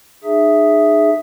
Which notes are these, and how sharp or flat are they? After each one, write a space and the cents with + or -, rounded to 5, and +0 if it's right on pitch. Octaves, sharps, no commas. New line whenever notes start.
D#4 -40 G#4 +0 E5 +0